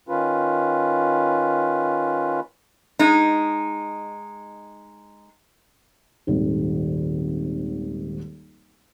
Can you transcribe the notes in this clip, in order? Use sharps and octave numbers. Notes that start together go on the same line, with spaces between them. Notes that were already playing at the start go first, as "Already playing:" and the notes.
D#3 C#4 F4 B4
G#3 D#4
D#1 G#1